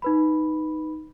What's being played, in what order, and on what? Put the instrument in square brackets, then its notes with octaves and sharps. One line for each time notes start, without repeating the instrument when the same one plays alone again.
[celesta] D#4 B4 B5